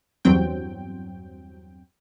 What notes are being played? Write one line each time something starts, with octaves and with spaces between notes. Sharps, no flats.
E2 G2 F#3 C4 G5